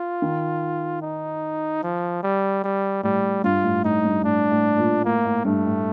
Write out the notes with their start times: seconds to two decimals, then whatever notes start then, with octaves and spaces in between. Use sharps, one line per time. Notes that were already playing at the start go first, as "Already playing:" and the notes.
Already playing: F4
0.22 D#3
1.02 D#4
1.83 F3
2.23 G3
2.64 G3
3.03 A2 G3
3.44 G2 F4
3.64 A2
3.84 A2 D#4
4.05 G2
4.24 A2 D4
4.51 A2
4.78 A#2
5.05 A2 A#3
5.25 A2
5.45 G2 A3
5.65 A2